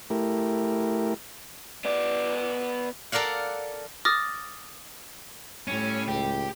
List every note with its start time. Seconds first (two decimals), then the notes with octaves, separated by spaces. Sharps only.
0.10 A3 E4 G4 A#4
1.85 B3 D5
3.12 A4 A#4 D5 F5 F#5
4.05 D6 D#6 F6 A6 A#6
5.68 A2 G3 C#4
6.08 C#2 G4